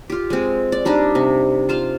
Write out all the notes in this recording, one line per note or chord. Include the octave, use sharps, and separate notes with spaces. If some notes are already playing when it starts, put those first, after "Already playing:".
F4 G4
G#3 C4
D5
G3 D4 D#4 G4
C3
F4 C5 F5